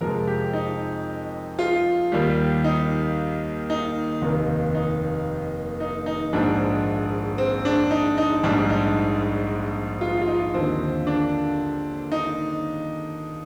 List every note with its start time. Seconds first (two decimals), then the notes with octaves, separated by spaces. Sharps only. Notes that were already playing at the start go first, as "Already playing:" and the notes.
0.01 F2 C3 F3 G#3 A#4
0.27 G4
0.53 D#4
1.59 F4
2.12 D#2 D#3 G3
2.64 D#4
3.70 D#4
4.22 F1 D#2 D#3
4.75 D#4
5.80 D#4
6.06 D#4
6.33 A#1 G#2 F3 D4
7.38 C4
7.65 D4
7.91 D#4
8.18 D#4
8.43 A#1 G#2 G3 D4
8.70 D#4
10.01 F4
10.21 F4
10.27 D#4
10.54 D#2 D3 F3 C4
11.07 D4
12.12 D#4